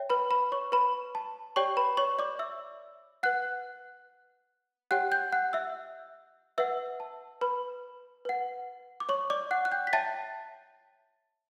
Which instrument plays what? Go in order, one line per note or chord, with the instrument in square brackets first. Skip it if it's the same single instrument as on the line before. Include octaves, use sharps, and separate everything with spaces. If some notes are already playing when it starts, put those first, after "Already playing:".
Already playing: [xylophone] C#5 E5 G5
B4 B5
B4 B5
C#5 C#6
B4 B5
A5
G4 C#5 D5 G5 C#6
B4 B5
C#5 C#6
D5 D6
E5 E6
B4 F#5 F#6
G4 C#5 F#5 G5 F#6
G5 G6
F#5 F#6
E5 E6
B4 E5 F#5 E6
A5
B4 B5
B4 F#5
D6
C#5 C#6
D5 D6
F#5 F#6
F#6
G5 G6
B6
C#5 E5 G5 A5 A6